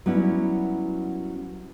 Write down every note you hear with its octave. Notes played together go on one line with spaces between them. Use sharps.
F#3 G3 B3 C#4 E4